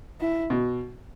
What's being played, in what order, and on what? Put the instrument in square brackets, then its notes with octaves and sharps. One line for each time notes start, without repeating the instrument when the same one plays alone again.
[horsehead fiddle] E4
[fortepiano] B2